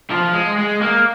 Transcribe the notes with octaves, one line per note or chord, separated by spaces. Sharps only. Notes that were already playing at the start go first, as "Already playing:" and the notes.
F3
G#3
G#3
A#3